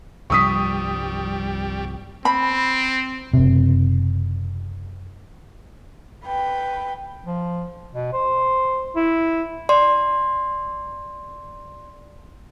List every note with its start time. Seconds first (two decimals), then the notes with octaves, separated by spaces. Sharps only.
0.30 C2 G2 F3 G3 C#6 D#6 B6
2.25 C4 B5
3.33 F#1 C3
6.26 B4 G5
7.26 F3
7.93 B2
8.13 C5
8.96 E4
9.69 D5 C6